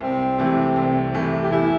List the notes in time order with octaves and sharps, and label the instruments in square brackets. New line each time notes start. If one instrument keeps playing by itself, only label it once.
[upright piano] C2 [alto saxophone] C4
[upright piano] C3 E3 A3
C2
C3 E3 A3
[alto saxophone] G4
[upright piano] E2 [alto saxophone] E4